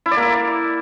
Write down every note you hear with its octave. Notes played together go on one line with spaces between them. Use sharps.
E4
D5
A#3